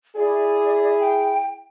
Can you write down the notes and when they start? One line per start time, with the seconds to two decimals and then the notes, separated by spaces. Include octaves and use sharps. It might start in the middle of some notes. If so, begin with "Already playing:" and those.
0.16 E4 G#4 D5
1.00 G5